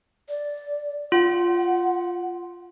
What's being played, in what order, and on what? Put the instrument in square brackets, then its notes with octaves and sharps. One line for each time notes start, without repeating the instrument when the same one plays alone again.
[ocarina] D5
[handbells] F4 [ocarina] F#5